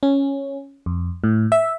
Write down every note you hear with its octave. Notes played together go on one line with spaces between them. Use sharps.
C#4
F2
A2
E5